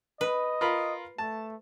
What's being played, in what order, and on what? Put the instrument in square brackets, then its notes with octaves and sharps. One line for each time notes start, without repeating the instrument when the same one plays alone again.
[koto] B4 [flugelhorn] D#5
[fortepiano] F4 A#4 B5
[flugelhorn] A3 [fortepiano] A5